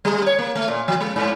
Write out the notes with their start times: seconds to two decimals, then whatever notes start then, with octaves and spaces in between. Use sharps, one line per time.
0.05 G3
0.26 C#5
0.39 A#3
0.55 A3
0.68 A#2
0.88 F3
1.00 G#3
1.16 G#2